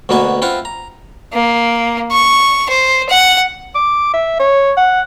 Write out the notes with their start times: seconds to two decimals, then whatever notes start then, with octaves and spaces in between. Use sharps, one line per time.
0.09 D2 B2 A#3 B3 F#4 G#5
0.42 C4 E4 F4 F5 F#5
0.65 A#5
1.33 A#3
2.11 C#6
2.69 C5
3.09 F#5
3.75 D6
4.14 E5
4.40 C#5
4.77 F#5